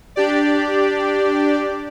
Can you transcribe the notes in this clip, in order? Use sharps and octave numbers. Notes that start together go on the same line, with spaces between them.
D4 G4 D5